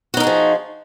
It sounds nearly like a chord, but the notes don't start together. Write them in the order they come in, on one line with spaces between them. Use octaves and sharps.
F#4 D#4 A#4 G#4 F3